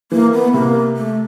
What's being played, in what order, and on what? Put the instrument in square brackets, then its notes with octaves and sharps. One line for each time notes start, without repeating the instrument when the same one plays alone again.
[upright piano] E3 [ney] A#3
[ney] B3
[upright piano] C3 [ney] A#3
[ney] A3